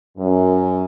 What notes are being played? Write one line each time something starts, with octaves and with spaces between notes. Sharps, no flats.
F#2